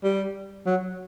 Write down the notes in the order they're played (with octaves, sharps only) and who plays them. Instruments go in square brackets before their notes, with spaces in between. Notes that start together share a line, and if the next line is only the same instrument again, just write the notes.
[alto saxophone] G3
F#3